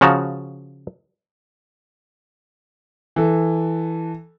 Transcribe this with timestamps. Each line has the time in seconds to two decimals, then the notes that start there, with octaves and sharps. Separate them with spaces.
0.01 C#3 F3 F#4 A5 A#5
3.16 E3 A4